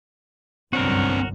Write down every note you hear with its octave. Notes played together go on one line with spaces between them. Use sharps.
G1 C2 F#2 C4 D4 F#4 A#4